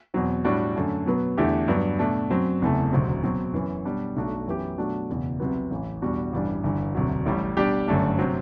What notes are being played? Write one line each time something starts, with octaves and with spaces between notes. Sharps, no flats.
E2 B2 F#3 C4
A2 G3 D4 F#4
F#2 D3 A3
B2 F#3 B3
E2 D3 A3 E4 G4
G2 F#3 B3
B2 A3 D4
F#2 F#3 C4
F#1 E2 C3 E3 A3
E1 D2 C3 F#3 C4
B2 F#3 C4
F#2 E3 B3
B2 G3 D4
B1 B2 A3 D4 F#4
F#2 E3 B3 E4 G4
B2 F#3 A3 D4 F#4
F#1 E2 B2
C2 C3 F#3 B3
A1 A2 E3
E2 B2 G3 D4 F#4
A1 G2 E3 G3 D4
G1 G2 E3
E1 D2 C3 F#3
A1 A2 G3
B2 G3 D4 G4
G1 F#2 D3 A3 D4
C3 F#3 C4